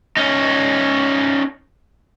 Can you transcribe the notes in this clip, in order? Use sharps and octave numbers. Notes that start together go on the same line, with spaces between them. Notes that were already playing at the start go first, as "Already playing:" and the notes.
C#4 D#4